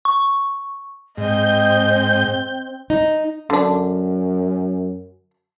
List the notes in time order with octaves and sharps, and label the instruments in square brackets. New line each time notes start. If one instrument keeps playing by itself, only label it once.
[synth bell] C#6
[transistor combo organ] G#2 [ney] C4 [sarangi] D#5 [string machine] G6
[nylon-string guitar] D#4
[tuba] F#2 [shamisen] D3 D4